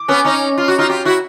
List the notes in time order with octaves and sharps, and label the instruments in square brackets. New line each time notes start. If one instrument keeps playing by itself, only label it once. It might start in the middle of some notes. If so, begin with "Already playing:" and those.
Already playing: [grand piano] D6
[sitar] B3 C#4
C#4 D#4
F4
F#4
D#4 F4
F4 G4
E4 F#4